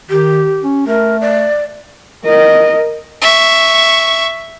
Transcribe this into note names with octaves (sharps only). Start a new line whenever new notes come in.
D#3 G4
C#4
A3 A#4
D5
A#4 D#5
E5 C#6